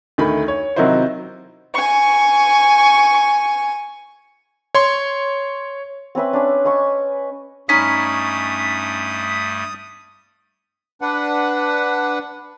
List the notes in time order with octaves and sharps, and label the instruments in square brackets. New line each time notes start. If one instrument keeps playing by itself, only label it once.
[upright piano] D2 D#3 A3 B5
C#5
C3 D#3 F#3 D#4 E4 C5
[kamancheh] G#5 C#6
[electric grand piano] C#5 C6
[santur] C4 C#4 B4 E5
C#4 D4
D#5 G#5 B5 C#6
[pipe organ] G2 G3 A3 [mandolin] C#4 D#4 B5 [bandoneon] D#6 [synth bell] B6
[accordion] D4 B4 F#5